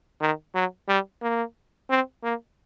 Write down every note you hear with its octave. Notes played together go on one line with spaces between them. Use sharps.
D#3
F#3
G3
A#3
C4
A#3